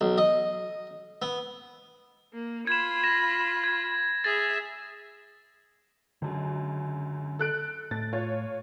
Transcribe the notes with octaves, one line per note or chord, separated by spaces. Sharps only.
B1
D#5
B3
A#3
F4 B5 G#6 E7
A#6 E7
G#6
G#4 E5 A6
C#2 F#2 D3
A4 F#6 D7
A2 A6
F4 C#5